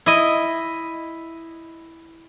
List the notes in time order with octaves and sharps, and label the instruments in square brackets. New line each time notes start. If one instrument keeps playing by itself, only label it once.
[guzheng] E4 D#5